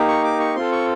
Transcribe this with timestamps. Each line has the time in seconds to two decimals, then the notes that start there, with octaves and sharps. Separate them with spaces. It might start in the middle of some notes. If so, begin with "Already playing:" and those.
Already playing: A#3 D#4 G4
0.08 C#6
0.24 D6
0.40 C#6
0.56 C4 F4 A4 C6
0.72 C#6